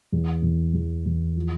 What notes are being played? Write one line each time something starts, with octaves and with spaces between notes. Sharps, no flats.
E2
E2
E2
E2
F3